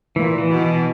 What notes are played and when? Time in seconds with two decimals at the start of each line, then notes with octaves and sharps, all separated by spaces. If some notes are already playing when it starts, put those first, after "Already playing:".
0.16 A#2 E3
0.38 E3
0.49 B2
0.60 E3